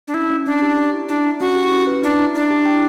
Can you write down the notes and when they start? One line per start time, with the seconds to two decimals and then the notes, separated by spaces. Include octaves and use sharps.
0.08 D4
0.14 C#4 E4
0.30 C#4
0.46 C#4 D4
0.62 G4
0.77 G4
0.93 E4
1.09 D4 E4
1.25 E4
1.40 C#4 F#4
1.56 G4
1.72 C#4
1.87 B4
2.03 D4 E4
2.19 E4
2.34 D4 E4
2.50 G4
2.66 G5